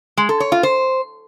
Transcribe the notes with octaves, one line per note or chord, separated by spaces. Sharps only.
G#3
A4
C#5
F4
C5